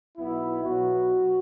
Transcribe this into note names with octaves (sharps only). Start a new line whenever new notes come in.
B1 B2 B3 E4
B1 B2 F#3 B3 F#4